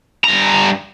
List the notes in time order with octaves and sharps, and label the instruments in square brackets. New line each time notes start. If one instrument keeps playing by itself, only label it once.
[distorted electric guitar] G2 A#5